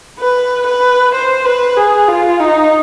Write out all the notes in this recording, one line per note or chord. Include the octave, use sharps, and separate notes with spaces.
B4
B4
C5
B4
G#4
F4
D#4